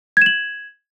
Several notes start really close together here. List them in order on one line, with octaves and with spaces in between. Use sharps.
G#6 E7 F#7